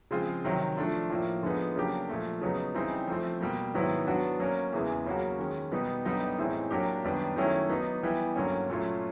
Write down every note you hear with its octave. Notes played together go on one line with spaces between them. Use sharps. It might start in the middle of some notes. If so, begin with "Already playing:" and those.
C#3 F3 G#3 C4 F4
C3 D#3 F#3
F3 A3 D4 F4
A2 F3 A#3
D3 F3 G#3 B3 D#4
C#3 F#3 A#3 D4 G4
A#2 F3 A3
C#3 F#3 B3 D#4
C#3 E3 G3 C4 D#4
F3 A3 C4
B2 G3 A#3
G#2 D#3 F#3 B3 E4
F#3 B3 D4 F#4
F#3 A#3 C#4
E2 C#3 E3 G#3 B3
C#3 F#3 A#3 C#4 F#4
D#3 G#3 C#4
B2 G3 B3 D#4
F#2 D3 G3 B3 D#4
A2 E3 G#3 C4 D#4
F#3 A#3 D4 G4
F#2 D#3 G3 B3 D4
D#3 F#3 A3 C#4 E4
F#3 B3 D#4
E3 G3 B3
G2 D3 F#3 A#3 C#4
A#2 F#3 A3 C#4 F4